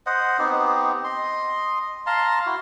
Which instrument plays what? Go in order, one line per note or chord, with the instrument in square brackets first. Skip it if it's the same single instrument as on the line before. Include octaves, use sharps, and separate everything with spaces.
[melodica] C5 D#5 F#5
B3 C4 D#4 G4
D#5 C6
F5 A5 A#5 C6
E4 F#4